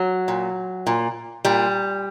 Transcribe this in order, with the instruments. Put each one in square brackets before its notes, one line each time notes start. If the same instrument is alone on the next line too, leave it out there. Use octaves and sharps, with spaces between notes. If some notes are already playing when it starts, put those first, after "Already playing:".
Already playing: [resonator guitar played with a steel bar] F#3
A#2
A#2
A#2 G3